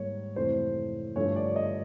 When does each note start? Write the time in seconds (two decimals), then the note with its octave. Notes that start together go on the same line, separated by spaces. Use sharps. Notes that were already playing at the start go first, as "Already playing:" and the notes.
Already playing: G#2 D#3 G3 A#3 C#5
0.36 F2 C3 E3 A3 C5
1.16 G2 D3 F3 A3 C#5
1.36 D5
1.56 D#5